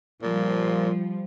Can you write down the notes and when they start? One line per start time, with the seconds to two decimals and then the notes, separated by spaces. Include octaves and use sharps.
0.23 A#2 F3 G3